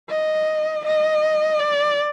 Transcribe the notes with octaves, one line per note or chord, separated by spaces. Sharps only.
D#5
D#5
D5